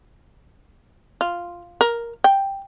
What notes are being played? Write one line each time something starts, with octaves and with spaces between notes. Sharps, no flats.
F4
A#4
G5